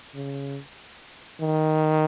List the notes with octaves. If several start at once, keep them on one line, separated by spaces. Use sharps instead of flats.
C#3
D#3